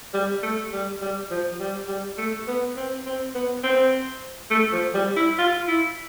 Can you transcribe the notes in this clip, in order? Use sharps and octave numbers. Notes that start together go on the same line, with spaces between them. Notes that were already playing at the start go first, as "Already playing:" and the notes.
G3
A3
G3
G3
F3
G3
G3
A3
B3
C4
C4
B3
C4
A3
F3
G3
E4
F4
E4